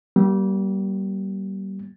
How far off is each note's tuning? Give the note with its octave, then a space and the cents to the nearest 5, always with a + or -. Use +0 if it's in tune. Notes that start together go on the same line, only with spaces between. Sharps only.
G3 -25 A#3 +30